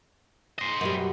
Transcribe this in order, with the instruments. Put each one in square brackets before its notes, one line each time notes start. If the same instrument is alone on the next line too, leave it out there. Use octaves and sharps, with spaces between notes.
[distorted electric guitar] C5 D#5
[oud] F#2 B2 G3